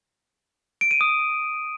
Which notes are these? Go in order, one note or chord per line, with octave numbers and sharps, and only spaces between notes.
D7
D#7
D#6